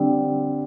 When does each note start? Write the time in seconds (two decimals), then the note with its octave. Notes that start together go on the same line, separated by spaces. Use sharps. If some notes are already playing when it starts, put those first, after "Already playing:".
Already playing: D3 G3 C4